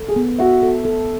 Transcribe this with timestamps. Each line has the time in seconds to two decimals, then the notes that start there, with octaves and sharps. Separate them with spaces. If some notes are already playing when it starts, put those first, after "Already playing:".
Already playing: A4
0.08 G#4
0.16 B3
0.39 F#4 E5
0.63 A4
0.85 A4